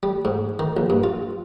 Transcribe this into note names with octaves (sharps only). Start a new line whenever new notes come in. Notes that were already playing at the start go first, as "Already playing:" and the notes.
G3
G#2
D#3
A#1
G2
F4